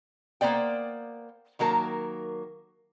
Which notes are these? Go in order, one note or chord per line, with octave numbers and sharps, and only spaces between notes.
A#3 B3 C5 D5 G5
D#3 F#3 A#3 A#4 A5